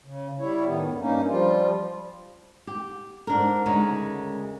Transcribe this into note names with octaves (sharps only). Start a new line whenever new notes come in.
C#3
G3 E4 C#5
A2 D#3 B3
E2 G2
G2 A#3 C#4 D#4
F3 G3 F4
G4
G#2 D4 A#4
D2 C#3 G#3 D#4 A#4 C#5